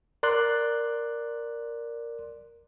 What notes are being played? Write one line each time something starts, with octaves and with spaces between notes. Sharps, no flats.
A#4 D5 C6 F#6